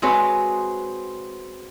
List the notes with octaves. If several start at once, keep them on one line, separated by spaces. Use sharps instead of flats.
G#3 C4 F#4 G#4 B4 C#5